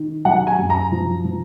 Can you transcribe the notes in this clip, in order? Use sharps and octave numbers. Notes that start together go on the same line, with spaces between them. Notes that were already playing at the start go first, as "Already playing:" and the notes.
Already playing: D#3
F#3 F#5
G#5
F#2
A#5
F3
F3